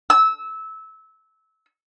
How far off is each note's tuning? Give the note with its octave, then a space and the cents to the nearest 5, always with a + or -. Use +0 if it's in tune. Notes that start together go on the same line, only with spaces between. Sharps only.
E6 -20